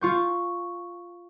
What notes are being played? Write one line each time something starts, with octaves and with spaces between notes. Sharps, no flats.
F4 C#6 G6